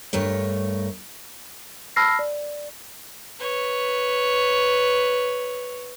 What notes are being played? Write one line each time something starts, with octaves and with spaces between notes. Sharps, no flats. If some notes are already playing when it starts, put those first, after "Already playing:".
G2 A3 A#4 C#5
A5 B5 E6 F6 A#6 C7
D5
B4 C#5